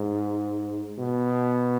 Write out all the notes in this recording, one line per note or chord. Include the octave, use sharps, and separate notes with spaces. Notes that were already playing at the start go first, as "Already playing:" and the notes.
Already playing: G#2
B2